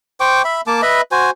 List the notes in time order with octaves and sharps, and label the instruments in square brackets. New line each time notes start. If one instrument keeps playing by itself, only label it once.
[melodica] C5 G5 C#6 D6
E5 B5
A#3 A5 D6
B4 D#5 E5 B5
F#4 C5 G#5